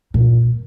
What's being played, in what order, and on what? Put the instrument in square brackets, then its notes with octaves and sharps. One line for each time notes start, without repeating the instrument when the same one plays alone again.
[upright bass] A#2